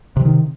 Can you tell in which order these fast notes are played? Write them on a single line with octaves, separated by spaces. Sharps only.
C3 E3 D#3